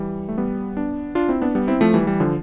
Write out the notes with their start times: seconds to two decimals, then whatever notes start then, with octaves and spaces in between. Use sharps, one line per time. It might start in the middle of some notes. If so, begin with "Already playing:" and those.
Already playing: E3 G3
0.29 A3
0.38 G3 B3
0.77 B3 D4
1.15 D4 F4
1.29 C4 E4
1.42 B3 D4
1.55 G3 B3
1.68 C4 E4
1.81 F3 A3
1.94 E3 G3
2.07 E3 G3
2.20 D3 F3